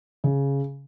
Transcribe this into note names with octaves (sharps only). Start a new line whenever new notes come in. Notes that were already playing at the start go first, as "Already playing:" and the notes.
C#3